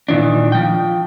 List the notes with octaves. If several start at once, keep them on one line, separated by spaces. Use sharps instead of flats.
A#2 D#3 E3 D4
F3 G5